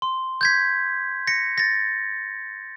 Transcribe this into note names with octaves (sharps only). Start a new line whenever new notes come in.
C6
G6 G#6 B6
A#6 B6 C#7
A6 A#6